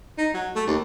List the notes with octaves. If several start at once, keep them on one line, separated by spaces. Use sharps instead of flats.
D#4
F#3
A3
D#2